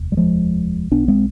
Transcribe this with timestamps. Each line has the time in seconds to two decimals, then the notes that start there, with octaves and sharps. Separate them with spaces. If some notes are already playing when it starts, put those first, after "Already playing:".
Already playing: F1 D#2
0.12 G3
0.17 F3 G#3
0.91 B1 B2 B3 D4
1.08 G#3 C4